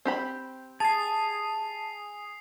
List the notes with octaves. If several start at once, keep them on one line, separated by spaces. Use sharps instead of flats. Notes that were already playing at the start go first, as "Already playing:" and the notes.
C4 G4 B5
G#4 A5 D#6 C7